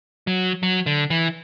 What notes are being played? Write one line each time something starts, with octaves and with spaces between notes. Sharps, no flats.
F#3
F#3
D3
E3